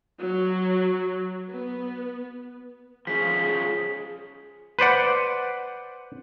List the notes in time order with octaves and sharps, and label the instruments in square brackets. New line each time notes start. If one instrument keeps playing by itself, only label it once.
[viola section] F#3
B3
[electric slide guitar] F3 C#4 F4 [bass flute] G#4 [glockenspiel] B6
[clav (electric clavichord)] B4 C5 D5 F#5